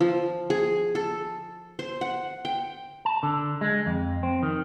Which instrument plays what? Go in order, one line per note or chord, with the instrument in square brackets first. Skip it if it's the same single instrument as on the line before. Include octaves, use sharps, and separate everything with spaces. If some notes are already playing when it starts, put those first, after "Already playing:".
[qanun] F3
G#4
A4
C5
F#5
G5
[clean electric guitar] A5
D3
G#3
F2
C4
D#3